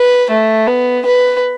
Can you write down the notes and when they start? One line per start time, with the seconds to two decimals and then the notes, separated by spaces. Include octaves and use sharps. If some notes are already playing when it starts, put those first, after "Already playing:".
Already playing: B4
0.31 A3
0.68 B3
1.06 B4